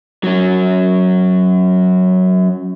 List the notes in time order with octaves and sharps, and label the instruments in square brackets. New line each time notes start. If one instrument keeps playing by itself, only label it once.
[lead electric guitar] F#3 C#4